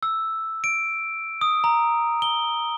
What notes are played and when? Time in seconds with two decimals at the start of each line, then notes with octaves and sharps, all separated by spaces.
0.03 E6
0.64 D7
1.41 D#6
1.64 A#5
2.22 G7